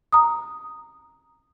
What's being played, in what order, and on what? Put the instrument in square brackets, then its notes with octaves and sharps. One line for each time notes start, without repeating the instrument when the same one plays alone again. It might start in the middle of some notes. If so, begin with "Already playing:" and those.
[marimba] A#5 D#6